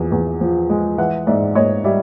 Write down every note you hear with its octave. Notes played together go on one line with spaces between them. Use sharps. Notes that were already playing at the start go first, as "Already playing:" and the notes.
Already playing: E2 F3
E2
F3
G#3
E3 E5 F#5
G#2 D5 E5
G#2 C#5 D#5
G3 D5 E5